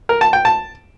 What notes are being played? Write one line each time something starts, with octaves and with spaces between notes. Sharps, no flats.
A#4
A5
G5
A5